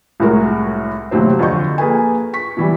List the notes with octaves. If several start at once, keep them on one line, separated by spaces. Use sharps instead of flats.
C2 A2 G#3 F#4 A#4
D#2 A2 C3 F#3 C5
F2 D3 D#5 C#6 G6
A#3 G#4 A4 B4 G#5
C#6 B6
B2 E3 G3